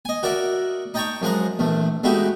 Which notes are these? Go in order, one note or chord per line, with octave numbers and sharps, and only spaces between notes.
D#5 G#5
F#4 A#4 D5 E5 F#5
D#4 D#5 G5 A5 A#5 C#6
F#2 F3 G#3 F#5 A#5
A#1 E2 A3
G#3 A3 B3 D#4 F#4 G4